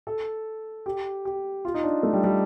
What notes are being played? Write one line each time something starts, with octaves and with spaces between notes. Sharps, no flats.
A4
G4
G4
F4
D#4
D4
A3
G3
G3